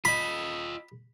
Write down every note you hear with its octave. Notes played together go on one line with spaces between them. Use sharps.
F4 D#5 B5